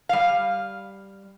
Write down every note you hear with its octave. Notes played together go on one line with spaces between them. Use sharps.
G3 F5